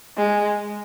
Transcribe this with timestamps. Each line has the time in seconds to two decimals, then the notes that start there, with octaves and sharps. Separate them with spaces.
0.18 G#3